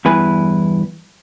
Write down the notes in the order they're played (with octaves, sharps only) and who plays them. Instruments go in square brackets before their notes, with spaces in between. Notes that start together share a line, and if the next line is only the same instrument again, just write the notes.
[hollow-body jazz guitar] E2 G2 E4 B4 G#5